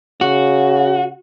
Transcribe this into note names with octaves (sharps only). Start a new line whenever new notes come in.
C#3 F#4